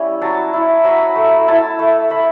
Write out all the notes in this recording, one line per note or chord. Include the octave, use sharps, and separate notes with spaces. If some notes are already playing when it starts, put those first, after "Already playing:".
Already playing: G3 C#4 E4
F#3 A5
E4
F#3 B5
A3
E4 A5
A3
A3 B5